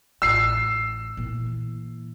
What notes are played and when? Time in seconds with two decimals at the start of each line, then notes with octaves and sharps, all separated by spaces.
0.22 A1 E6 C7
1.17 A#2 E3